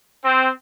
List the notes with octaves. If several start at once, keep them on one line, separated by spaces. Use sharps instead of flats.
C4